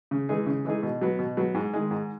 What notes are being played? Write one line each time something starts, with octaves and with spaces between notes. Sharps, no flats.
C#3
E3 G#3 D#4 G#4
C#3
E3 G#3 D#4 G#4
B2
F#3 B3
B2
F#3 B3
G#2
D#3 G#3
G#2